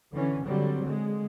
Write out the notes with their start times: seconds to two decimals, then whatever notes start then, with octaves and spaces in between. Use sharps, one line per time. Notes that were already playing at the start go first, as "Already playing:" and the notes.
0.12 D3 E3 C#4
0.44 D3 F#3 G3 C4
0.80 D3 G#3